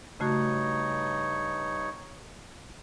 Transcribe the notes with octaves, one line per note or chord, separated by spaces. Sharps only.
G2 C#3 A3 D#4 F#4 C#5